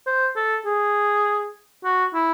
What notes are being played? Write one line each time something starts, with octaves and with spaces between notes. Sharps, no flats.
C5
A4
G#4
F#4
E4